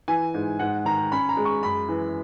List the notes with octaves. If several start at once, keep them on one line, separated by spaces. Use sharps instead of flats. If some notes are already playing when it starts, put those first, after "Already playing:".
E3 G#5
G#2
G#2 F#5
D#3 A#5
C#4 B5
A#5
G#3
C#6
F#2 B5
E3